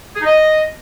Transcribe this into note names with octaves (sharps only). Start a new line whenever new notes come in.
G#4
D#4
D#5